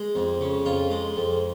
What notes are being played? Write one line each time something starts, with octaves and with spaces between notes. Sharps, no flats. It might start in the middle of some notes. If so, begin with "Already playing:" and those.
Already playing: G#3
F2
C#3
F2 F4
G#3
F2